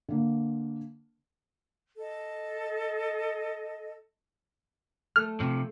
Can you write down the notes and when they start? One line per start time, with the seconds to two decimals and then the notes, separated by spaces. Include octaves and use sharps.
0.09 D3 A#3
1.97 A4 D#5
5.16 A3 A4 F6
5.40 C3 F3